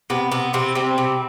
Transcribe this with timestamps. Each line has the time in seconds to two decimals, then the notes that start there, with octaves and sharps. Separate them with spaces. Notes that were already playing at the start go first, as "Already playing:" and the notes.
0.10 C3 B3
0.32 C3 B3
0.53 C3 E3 C4
0.75 C3 G3 C4
0.98 C3